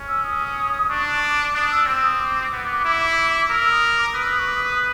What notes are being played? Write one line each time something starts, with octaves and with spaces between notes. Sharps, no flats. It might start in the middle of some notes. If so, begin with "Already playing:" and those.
Already playing: C#4
E6
D#6
D4 C#6
D6
D4 D#6
E6
C4 E6
D#6
D6
B3
E4
A#4 E6
E6
D#6
D6
B4 D#6
E6
D#6
C#6
D6
D#6
D#6